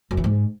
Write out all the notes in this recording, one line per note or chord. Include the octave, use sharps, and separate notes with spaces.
F#2
E3
G#2